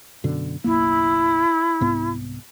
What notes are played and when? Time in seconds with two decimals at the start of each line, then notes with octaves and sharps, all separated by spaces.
0.24 F#2 B2 D3
0.64 F#1 B1 A#3 E4
1.81 C2 G#2 B3